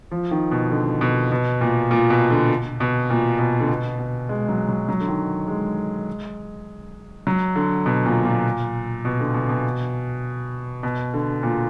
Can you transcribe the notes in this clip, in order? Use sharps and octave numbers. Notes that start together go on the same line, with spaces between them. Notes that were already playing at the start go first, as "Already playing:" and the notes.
F3
D#3
B2
D3
B2
B2
A#2
A#2
B2
D3
B2
A#2
B2
D3
B2
B2
G#3
F#3
F#3
F#3
D3
D#3
G#3
F#3
D3
B2
A#2
A#2
B2
D3
B2
B2
B2
D3
A#2